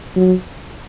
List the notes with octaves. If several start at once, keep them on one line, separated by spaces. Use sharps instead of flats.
F#3